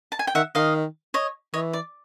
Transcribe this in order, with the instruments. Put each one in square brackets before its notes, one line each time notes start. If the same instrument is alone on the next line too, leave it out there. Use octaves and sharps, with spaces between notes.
[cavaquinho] A5
G#5
G5
[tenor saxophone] D#3 [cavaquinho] E5 F#5
[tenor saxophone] D#3 [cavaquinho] D#5 F5
[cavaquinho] C#5 D#5
[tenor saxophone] E3 [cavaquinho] C#5 D#5
[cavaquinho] D5